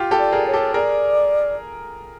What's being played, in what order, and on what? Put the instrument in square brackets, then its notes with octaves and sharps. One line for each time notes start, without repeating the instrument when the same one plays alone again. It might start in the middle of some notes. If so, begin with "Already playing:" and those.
Already playing: [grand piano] F4 G4
G4 A4
[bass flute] D5
[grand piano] G#4 A#4
[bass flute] C#5
[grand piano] G4 A4
[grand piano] G#4 A#4 [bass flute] D5